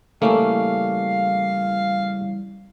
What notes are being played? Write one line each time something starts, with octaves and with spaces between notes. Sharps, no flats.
C#3 E3 G3 A3 A#3 C#4 F5